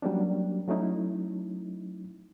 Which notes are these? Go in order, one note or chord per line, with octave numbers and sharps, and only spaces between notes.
F#3 G3 A#3 C#4 D4
F#3 A3 C#4 D#4 E4